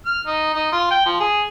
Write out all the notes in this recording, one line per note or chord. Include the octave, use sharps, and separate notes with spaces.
F6
D#4
D#4
F4
G5
F3
G#4